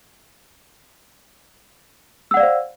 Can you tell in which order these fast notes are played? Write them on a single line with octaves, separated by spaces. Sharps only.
E6 F#5 D5 F5 C5